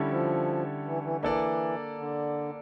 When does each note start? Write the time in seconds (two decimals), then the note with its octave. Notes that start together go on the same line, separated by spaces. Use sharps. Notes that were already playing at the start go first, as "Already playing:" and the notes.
Already playing: D3 G3 C#4 E4 A4
0.11 F3
0.86 E3
1.04 E3
1.23 E3 A#3 D4 A4 D5
1.98 D3